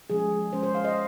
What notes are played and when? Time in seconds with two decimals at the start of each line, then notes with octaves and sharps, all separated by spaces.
0.10 F3 G#3 C#4 G#4
0.53 F3 G#3 C#4 C5
0.63 C5
0.75 F5
0.85 D#5